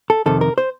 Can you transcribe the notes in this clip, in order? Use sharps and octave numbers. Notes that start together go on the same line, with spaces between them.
A4
F2 C3 D#3 A4
A#4
C5